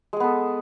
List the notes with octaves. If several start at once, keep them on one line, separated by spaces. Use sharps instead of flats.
G#3 B3 G#4 A4